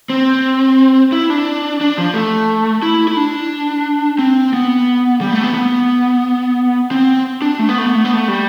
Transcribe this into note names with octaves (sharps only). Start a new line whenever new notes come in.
C4
E4
D4
D4
F3
A3
E4
E4
D4
C4
B3
G3
A3
B3
B3
C4
D4
A3
B3
A3
B3
A3
B3
A3
G3